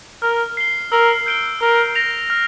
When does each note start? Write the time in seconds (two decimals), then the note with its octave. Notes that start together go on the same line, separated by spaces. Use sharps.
0.22 A#4 F6
0.57 C7 G7
0.92 A#4 E6
1.26 G6 D7 G7
1.60 A#4 E6
1.95 A#6 F7
2.30 F6